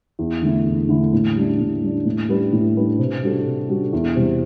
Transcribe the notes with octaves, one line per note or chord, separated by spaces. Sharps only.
E2
D3 A3 E4
E2
D3 A3 E4
A2
G3 D4
A2
G3 D4
A2
G3 D4 G4 B4
A2
G3 D4 G4 B4
C3
G3 D4 F#4 A4
C3
G3 D4 F#4 A4
E2
C3 G3